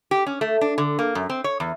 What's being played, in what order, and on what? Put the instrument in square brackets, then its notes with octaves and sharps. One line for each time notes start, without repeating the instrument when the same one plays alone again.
[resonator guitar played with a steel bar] G4
C#4
A3
D4
D3
A#3
F#2
C4
C#5
E2